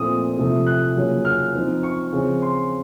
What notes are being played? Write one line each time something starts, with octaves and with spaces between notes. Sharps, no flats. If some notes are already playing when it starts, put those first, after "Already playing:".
Already playing: A#2 F3 A3 C4 D#6
C3 F3 A3
F#6
C#3 F#3 A#3 C#4 F4
F6
F3 C4 D#4
C#6
C#3 F3 C4 F4
C6